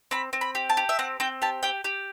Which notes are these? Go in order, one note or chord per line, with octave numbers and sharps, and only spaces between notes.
C4 B5
C4
B5
G4
A5
G4
E5
C4 F#5
C4 G5
G4 A5
G4 G5
G4